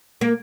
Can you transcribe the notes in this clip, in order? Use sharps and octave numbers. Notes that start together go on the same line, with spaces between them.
A#3